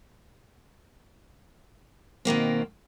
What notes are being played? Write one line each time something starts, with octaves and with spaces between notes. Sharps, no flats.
B2 D#3 A#3 C4